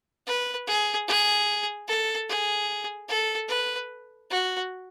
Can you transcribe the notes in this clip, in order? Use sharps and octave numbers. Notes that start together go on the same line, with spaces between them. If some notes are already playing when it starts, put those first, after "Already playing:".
B4
G#4
G#4
A4
G#4
A4
B4
F#4